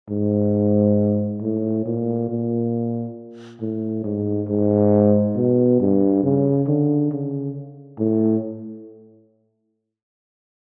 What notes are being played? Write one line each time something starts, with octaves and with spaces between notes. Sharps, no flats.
G#2
A2
A#2
A#2
A2
G#2
G#2
B2
G2
C#3
D3
C#3
A2